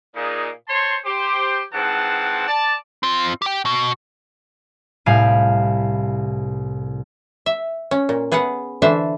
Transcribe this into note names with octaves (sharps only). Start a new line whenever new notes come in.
A#2 D#4 G#4
C5 C#5 A5 C6
G4 C5
G#2 E3 F3 C4 F#5 A5
D5 A5
C4 F4
G4 G5
B2 F#4
C2 A2 G4 F5 G#5 B5
E5
C#4
A#2
B3 G#4 B4 F5 F#5
D3 E3 D4 C5 E5 A5